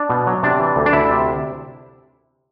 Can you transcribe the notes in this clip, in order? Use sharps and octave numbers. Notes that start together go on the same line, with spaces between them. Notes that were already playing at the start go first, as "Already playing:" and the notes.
Already playing: D4
B2
F#3
C3 D4
E3
D2
D4
D2 E4
C3